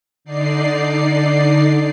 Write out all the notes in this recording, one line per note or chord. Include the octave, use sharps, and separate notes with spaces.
D3 D#4 D5 C7